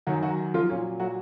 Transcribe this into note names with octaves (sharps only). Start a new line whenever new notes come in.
F#2 D#3 F#3 F#4
F#3 F#4
F3 F4
A#2 F#3 C#4
F#3 F#4